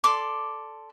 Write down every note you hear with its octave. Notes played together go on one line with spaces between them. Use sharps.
A4 D5 C6 D6